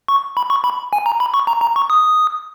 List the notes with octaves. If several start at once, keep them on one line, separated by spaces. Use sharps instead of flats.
C#6
B5
C#6
B5
G#5
A#5
B5
C#6
A#5
A#5
C#6
D#6